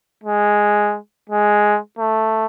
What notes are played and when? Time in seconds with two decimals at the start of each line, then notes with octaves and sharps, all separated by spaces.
0.24 G#3
1.29 G#3
1.99 A3